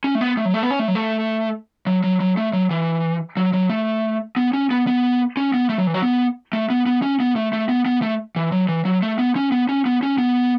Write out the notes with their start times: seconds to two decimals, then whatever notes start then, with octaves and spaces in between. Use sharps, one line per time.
0.04 C#4
0.15 A3
0.21 B3
0.37 A3
0.45 F#3
0.54 A3
0.63 B3
0.71 C#4
0.79 A3
0.88 F#3
0.95 A3
1.87 F#3
2.04 F#3
2.20 F#3
2.37 A3
2.53 F#3
2.71 E3
3.37 F#3
3.54 F#3
3.70 A3
4.37 B3
4.53 C#4
4.71 B3
4.87 B3
5.37 C#4
5.54 B3
5.69 A3
5.78 F#3
5.87 E3
5.94 F#3
6.02 B3
6.53 A3
6.70 B3
6.86 B3
7.02 C#4
7.20 B3
7.36 A3
7.53 A3
7.69 B3
7.86 B3
8.02 A3
8.36 E3
8.52 F#3
8.69 E3
8.85 F#3
9.03 A3
9.19 B3
9.36 C#4
9.52 B3
9.69 C#4
9.86 B3
10.03 C#4
10.18 B3